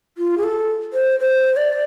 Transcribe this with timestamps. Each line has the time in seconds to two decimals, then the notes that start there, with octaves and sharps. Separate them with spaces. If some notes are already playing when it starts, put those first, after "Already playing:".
0.18 F4
0.38 G#4
0.43 A4
0.93 C5
1.20 C5
1.57 D5